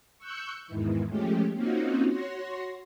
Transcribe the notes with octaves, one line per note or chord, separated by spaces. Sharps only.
C#6 E6 F#6 G6 C#7
E2 G#2 D#3 E3
F3 G#3 A3 C#4 G4
A#3 C4 C#4 D#4 F4 F#4
F#4 C#5 C6 A#6